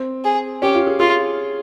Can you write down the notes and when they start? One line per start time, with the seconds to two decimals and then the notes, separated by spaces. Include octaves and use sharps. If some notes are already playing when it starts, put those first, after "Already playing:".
Already playing: C4
0.25 G#4
0.62 C#4 G4
0.75 F4
0.87 G#4
1.00 F4 G#4